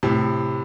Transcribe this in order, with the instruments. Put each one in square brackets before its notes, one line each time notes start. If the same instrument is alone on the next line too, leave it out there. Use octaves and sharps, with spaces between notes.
[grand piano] A2 C3